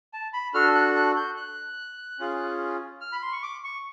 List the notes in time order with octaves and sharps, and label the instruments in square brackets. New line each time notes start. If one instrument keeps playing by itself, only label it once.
[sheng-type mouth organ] A5
B5
D4 F#4 A4 F6
F#6
F#6
G6
F#6
C#4 F4 G#4
F6
B5
C6
C#6
D6
C#6